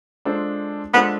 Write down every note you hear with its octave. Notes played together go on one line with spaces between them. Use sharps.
G#3 D4 F4 A4 C5
G#3 B3 D4 F4 A4 C5